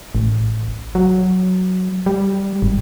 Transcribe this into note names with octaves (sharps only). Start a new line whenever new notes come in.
A1
F#3
G3
G#1